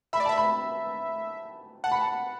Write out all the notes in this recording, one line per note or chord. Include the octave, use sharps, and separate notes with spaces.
E5 B5
D5
E5 A5
B5
F#5 A5
B5
A5